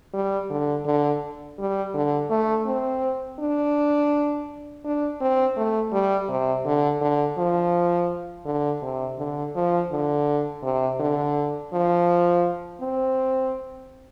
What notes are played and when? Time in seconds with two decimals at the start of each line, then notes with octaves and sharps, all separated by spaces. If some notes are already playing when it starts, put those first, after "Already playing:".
0.13 G3
0.50 D3
0.86 D3
1.59 G3
1.94 D3
2.30 A3
2.66 C4
3.39 D4
4.85 D4
5.21 C4
5.57 A3
5.92 G3
6.29 C3
6.65 D3
7.01 D3
7.38 F3
8.46 D3
8.82 C3
9.18 D3
9.56 F3
9.91 D3
10.63 C3
11.00 D3
11.73 F3
12.81 C4